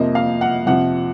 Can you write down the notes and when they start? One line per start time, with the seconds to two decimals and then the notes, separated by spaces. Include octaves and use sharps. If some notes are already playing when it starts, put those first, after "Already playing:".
Already playing: F2 C3 F3 A#3 D#5
0.15 F5
0.41 F#5
0.66 F2 C3 F3 F#5